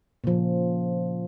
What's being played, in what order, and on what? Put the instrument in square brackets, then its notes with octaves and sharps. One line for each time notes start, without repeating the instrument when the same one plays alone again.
[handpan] A#2 C#3 F3